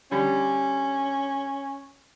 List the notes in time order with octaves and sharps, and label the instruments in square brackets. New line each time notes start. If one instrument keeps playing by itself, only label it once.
[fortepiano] D3 G3 [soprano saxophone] C#4